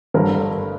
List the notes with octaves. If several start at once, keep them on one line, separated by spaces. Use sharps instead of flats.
G1 G2 D3 A#4